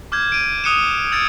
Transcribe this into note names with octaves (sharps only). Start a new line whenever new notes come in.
D6 F6 G6 G#6
D7 D#7
D#6 F#6 C#7 D#7 E7
E6 G#6 A6 D7